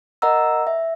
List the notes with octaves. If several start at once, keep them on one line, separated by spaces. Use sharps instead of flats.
A#4 D#5 F#5 A#5 E6
E5